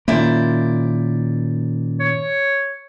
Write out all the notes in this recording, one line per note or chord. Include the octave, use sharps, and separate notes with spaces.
A#2 D#3 A#3 C#4 E4 C5 D5
C#5